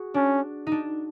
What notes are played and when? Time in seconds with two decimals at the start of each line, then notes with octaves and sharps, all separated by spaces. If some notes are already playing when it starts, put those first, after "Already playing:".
Already playing: F#4 G#4
0.15 C#4 D4
0.67 D#4
0.72 D4